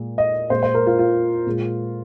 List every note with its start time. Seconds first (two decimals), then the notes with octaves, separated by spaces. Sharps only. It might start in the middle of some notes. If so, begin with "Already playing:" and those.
Already playing: A#2 G#3
0.18 D#5
0.50 A#2 G#3 C5
0.63 C5
0.74 A#4
0.87 F4
0.99 F4
1.47 A#2 G#3